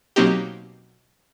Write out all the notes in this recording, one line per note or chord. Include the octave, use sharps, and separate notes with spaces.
B2 F#3 A#3 C4 D#4 G4